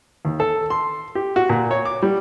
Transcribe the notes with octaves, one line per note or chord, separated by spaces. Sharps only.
D#2
A4
C6
G4
F#4
A#2
C#5
D6
G3